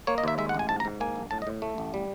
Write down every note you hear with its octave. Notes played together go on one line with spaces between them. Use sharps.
A#3 C#5
D#5
D#2 E5
G#3 E5
F#5
A1 G#5
G#2 A5
A#5
G#2
A#3 G#5
A#1
A2 A5
D#5
A2
A3
A1
G3